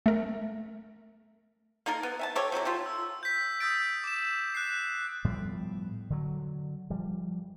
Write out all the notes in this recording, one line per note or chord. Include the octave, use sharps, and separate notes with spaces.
A3 A#4
A#3 D#4 A4 A#4
B3
E5 G#5 A5
G4 A4 C#5
C3 F#3 E4 A4
F4 G4 A4
E6
G6 B6
D#6 E6 G6 A6 D7
D6 E7
F#6 C7
A2 F3 G3 B3
D3 F#3
F3 G3